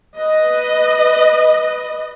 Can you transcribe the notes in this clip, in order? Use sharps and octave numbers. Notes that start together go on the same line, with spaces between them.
B4 D#5